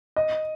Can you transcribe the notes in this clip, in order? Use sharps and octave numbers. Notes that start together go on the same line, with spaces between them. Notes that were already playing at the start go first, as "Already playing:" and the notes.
D#5